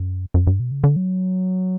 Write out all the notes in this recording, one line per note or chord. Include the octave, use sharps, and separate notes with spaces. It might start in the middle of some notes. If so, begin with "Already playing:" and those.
Already playing: F#2
F#2
G2
B2
C#3
D3
F#3